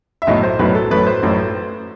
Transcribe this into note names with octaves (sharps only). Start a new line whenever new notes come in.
E5
B1 A2 F#3 D#5
C5
B1 A2 F#3 B4
A4
A1 A2 F#3 B4
C5
A1 A2 F#3